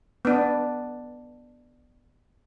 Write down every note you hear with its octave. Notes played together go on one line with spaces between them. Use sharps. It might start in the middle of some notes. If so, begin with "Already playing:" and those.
B3 D4